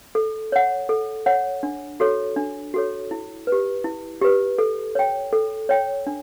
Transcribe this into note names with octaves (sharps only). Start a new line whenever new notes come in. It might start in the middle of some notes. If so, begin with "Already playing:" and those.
A4
C#5 F#5
A4
C#5 F#5
D4
F#4 A4 C#5
D4
F#4 A4 C#5
E4
B4
G4
E4
G4 B4
A4
C#5 G5
A4
C#5 G5
D4